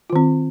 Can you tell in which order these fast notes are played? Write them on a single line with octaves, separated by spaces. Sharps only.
F4 D#3 C4